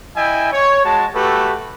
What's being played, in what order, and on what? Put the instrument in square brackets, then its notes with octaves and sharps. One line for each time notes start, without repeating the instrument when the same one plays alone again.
[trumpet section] E4 D#5 E5 G5 G#5
C#5
G#3 F#4 A5
A3 F#4 G4 A4 B4